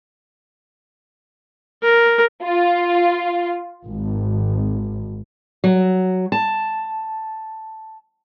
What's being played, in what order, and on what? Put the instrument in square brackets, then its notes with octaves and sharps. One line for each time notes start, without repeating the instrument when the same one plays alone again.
[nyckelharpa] A#4
[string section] F4
G#1
[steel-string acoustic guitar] F#3
A5